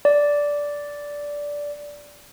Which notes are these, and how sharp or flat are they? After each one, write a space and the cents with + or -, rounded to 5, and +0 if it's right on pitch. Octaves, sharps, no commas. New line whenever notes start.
D5 -10